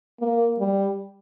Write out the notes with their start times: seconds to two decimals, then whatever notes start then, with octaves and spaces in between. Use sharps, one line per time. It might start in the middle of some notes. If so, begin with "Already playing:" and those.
0.20 A#3
0.59 G3